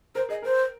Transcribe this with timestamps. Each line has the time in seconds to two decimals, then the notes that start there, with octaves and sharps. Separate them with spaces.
0.15 A#4 C5
0.29 G#4 D#5
0.42 A#4 C5